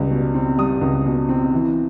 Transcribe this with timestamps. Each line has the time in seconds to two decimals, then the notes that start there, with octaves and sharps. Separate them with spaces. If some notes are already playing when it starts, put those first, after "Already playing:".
Already playing: C#2 G3
0.11 B2
0.34 C4
0.58 G3 D#6
0.81 C#2
1.06 B2
1.29 C4
1.53 E3